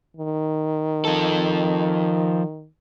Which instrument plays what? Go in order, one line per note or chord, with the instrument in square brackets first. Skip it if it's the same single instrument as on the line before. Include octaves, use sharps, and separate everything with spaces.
[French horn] D#3
[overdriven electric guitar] F3 A4